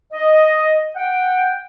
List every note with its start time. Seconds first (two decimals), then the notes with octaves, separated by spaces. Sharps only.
0.12 D#5
0.95 F#5 G5